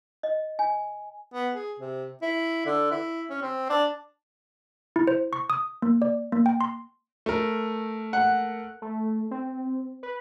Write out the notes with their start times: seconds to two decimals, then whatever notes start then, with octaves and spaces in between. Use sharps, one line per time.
0.23 D#5
0.59 G#5
1.34 B3
1.55 G#4
1.80 C3
2.22 E4
2.66 D3
2.92 E4
3.30 C#4
3.42 C4
3.70 D4
4.96 E4
5.07 C5
5.33 C#6
5.50 D#6
5.82 A#3
6.02 D5
6.32 A#3
6.46 G5
6.61 C6
7.26 A3 A#4
8.13 F#5
8.82 A3
9.31 C4
10.03 B4